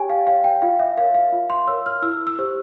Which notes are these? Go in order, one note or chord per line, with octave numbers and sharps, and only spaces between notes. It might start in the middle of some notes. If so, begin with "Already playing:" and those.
Already playing: G4 C#5 G5 G#5
F5
C#5 F5
G5
F4 F5
E5
A#4 C#5 F5
F5
F4
C6
A#4 C#5 E6
F6
E4 E6
E6
G4 C5